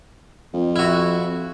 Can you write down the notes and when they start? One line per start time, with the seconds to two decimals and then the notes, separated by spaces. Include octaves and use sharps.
0.53 F2
0.76 E4 F#4